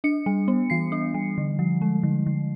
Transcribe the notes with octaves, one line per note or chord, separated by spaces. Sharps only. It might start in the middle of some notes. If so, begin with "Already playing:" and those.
D4 C#7
G3
B3
E3 C7
D4
G3
D3
F3
G#3
D3
D3